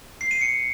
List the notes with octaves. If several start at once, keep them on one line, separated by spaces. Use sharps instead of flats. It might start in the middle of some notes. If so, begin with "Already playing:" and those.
C7
D#7
C#7